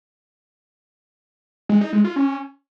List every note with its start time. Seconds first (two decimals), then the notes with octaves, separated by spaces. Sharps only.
1.69 G#3
1.81 D#4
1.93 G#3
2.04 F4
2.16 C#4